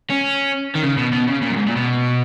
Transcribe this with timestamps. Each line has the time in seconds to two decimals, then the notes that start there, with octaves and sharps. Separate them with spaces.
0.10 C#4
0.75 D#3
0.83 C#3
0.97 B2
1.13 B2
1.27 C#3
1.42 A#2
1.50 F#2
1.56 G#2
1.67 A#2
1.76 B2